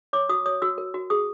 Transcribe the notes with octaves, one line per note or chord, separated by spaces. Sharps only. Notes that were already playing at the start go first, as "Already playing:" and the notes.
C#5 D6
F#4 D#6
C#5 D#6
F#4 E6
A#4
F#4
G#4 D#6